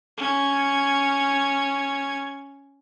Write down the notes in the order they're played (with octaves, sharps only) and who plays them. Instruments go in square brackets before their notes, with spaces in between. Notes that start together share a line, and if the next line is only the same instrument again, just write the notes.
[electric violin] C#4 G#6